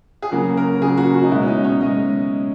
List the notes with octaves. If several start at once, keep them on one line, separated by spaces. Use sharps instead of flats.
G#4
C#3 F#3 A#3 F#4
A#4
C#3 F#3 A#3 G#4
F#4
F#4
D#4
B2 G#3 E4
C#4
D#4
C#5
B2 G#3 D#5